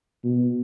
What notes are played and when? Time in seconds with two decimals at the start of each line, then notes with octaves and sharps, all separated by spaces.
0.24 B2